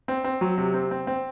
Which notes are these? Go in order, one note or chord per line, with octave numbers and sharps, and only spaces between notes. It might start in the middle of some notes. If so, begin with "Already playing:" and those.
C4
C4
F#3
C3
C4
C4
C4